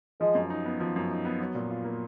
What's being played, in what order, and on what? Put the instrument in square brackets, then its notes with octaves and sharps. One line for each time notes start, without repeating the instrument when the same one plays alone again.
[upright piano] F3 [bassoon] G#3
[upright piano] F#2
D#4
B3
F3
F#2
D#4
B3
F#3
A#2
F4
A#3